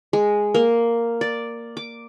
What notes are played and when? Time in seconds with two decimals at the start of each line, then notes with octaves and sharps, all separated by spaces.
0.13 G#3
0.54 A#3
1.21 D5
1.77 D6